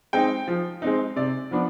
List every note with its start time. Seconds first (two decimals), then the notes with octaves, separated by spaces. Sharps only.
0.13 G#3 C4 D#4 G5
0.48 F3
0.82 G#3 C4 D#4
1.16 C3 D5
1.51 F3 B3 D4